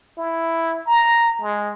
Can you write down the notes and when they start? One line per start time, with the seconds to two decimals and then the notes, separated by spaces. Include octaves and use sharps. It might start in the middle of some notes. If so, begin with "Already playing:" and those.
0.18 E4
0.86 A#5
1.41 G#3